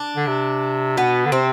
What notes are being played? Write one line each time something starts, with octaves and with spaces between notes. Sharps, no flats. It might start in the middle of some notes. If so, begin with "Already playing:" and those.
Already playing: D4
D3
C3
B2 B3
D3
C3 C4